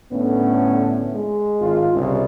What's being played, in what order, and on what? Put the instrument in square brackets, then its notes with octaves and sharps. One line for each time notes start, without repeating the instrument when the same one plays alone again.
[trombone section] A2 D3 C#4 [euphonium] B3
[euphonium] G#3
[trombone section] G#1 F4
C2 C#3